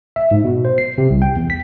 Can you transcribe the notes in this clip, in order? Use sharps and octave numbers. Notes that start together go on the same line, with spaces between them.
E5
G#2
B2
C5
C7
C3
C2
G5
E2
B6